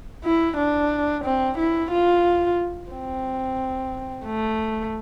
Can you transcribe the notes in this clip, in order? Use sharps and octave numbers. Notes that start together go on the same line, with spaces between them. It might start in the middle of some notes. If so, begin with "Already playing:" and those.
E4
D4
C4
E4
F4
C4
A3